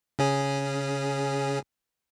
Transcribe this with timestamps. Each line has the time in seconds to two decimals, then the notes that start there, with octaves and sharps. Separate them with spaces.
0.19 C#3 C#4 G#4